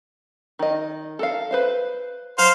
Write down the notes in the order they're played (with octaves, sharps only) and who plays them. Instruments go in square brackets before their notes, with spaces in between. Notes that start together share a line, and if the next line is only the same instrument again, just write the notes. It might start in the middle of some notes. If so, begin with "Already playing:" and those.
[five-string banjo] D#3 D#5
A4 A#4 F5
B4 C5 F5
[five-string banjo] F#3 [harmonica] C5 F5